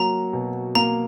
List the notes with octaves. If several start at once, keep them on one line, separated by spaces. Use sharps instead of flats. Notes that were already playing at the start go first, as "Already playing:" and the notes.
Already playing: F#3 A#3 A#5
B2
A#3 A#5